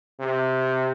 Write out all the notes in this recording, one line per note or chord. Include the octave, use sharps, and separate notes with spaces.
C3